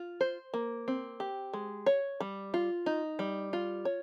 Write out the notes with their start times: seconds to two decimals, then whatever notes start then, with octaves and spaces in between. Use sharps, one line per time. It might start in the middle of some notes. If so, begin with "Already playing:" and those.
Already playing: F4
0.21 C5
0.54 A#3
0.88 C4
1.20 G4
1.53 G#3
1.86 C#5
2.20 G3
2.54 F4
2.86 D#4
3.19 G3
3.53 F4
3.85 C#5